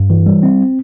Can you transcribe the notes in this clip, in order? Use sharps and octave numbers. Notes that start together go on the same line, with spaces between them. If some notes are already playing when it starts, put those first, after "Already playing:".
Already playing: G2
E3
G3
C4